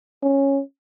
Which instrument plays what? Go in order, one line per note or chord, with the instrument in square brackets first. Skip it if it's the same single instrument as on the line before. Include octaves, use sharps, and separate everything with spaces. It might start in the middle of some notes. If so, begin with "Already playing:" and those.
[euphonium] C#4